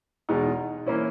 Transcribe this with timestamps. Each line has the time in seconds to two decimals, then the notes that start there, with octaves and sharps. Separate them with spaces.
0.29 E2 B2 G#3 D#4 F#4
0.86 E3 A#3 C#4 E4